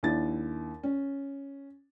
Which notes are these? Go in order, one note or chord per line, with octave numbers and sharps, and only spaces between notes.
D#2 D4 E4 A6
C#4